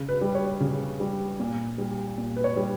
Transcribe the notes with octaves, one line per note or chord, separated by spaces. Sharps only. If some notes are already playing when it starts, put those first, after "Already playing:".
Already playing: C#3
B4
G3
C#5
C#3
G3
A#2
G3
A#2
B4
C#5
G3